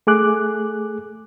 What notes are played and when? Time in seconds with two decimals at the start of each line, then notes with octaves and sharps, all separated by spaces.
0.07 A3 G#4 D6 F#6